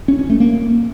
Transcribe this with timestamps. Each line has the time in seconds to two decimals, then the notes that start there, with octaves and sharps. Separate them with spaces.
0.08 C#4
0.19 C#4
0.30 A3
0.40 A#3